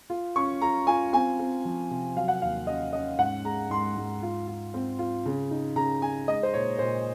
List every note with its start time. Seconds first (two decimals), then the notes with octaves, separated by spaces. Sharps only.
0.10 F4
0.36 C#4 C#6
0.62 F4 A#5
0.87 F4 G#5
1.13 C4 G#5
1.39 C4
1.65 F3
1.91 C3
2.16 F#3 F5
2.28 F#5
2.42 D#2 F5
2.67 C#4 D#5
2.93 C#4 D#5
3.18 G#2 F#5
3.44 G#3 A#5
3.70 G#2 C6
3.97 G#2
4.23 F4
4.48 F4
4.74 C4
4.99 F4
5.26 C#3
5.51 D#4
5.76 C#3 A#5
6.02 D#4 G#5
6.27 G#3 D#5
6.43 C5
6.53 A#2 C#5
6.79 A#2 C5